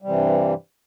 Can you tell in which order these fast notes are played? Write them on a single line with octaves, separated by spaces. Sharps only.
G3 C3 E3 G2